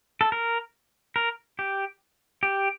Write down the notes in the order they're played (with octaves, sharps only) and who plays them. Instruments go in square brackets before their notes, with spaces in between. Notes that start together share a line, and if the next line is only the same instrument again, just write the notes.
[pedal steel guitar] A4
A#4
A#4
G4
G4